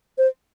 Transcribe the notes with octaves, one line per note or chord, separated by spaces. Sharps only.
C5